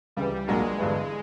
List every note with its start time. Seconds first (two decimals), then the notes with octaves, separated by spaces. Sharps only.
0.17 C#2 C#3 E3 G3
0.48 A#1 A#2 F#3 G#3 A#3 D4
0.78 G1 G2 E3